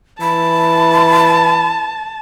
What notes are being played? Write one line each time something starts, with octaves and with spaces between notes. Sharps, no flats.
E3 A5 B5